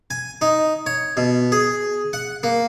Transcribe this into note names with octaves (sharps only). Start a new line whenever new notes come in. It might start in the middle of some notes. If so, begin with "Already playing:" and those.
G#5
D#4
C#5
B2
G#4
F#5
A#3